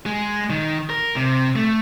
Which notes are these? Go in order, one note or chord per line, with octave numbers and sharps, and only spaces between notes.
G#3
D#3
A#4
C3
A3